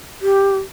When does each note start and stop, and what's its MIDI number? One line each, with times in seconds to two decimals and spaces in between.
0.22 0.57 67